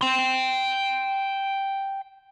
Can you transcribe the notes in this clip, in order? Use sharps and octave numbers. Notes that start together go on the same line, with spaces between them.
G5 C6